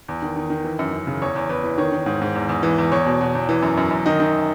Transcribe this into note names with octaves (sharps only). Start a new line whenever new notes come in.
E2
D#3
D#3
D#3
E3
F#2
F#2
C#3
E2 C#5
E2
E2 B4
E3
D#3 C#5
D#3
G#2
G#2
E2
E2
E3
E2
E2 C#5
B2
B2
E2
E3
F#2
F#2
F#2
D#3 D#5
D#3